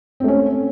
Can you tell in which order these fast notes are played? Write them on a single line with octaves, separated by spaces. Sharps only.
C4 A3 C#4